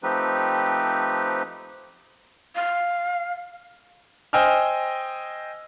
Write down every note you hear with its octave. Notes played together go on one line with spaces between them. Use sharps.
F3 A3 C4 D#4 G4 B4
F5
C5 D#5 G5 G#5 E6 F6